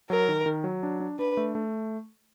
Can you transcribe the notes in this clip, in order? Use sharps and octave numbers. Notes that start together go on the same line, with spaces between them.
F#3 A#4
D#3
D#3
F#3
D4
D4
D4 B4
A3
A3